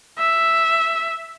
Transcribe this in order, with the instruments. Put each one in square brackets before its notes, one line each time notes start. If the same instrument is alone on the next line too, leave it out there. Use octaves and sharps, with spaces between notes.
[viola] E5